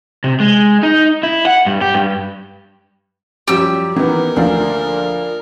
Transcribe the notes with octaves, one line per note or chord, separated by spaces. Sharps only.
C3
G#3
D#4
E4
F#5
G2
G4
G2
F#2 F3 G3 G4 E6
D#3 E3 B3 A#4
D2 F3 A#3 D4